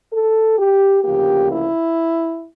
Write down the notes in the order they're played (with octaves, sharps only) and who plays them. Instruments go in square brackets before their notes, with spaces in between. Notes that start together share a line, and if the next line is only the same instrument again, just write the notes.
[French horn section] A4
G4
D2 C#3 F3 A#3 G4
E4